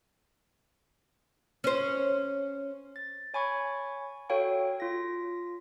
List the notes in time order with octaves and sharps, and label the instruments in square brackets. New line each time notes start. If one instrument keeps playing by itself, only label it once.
[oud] C#4 C5
[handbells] A6
C#5 G#5 B5 C#6 G#6
F#4 A4 C#5 F5 G5 C#6
F4 A#6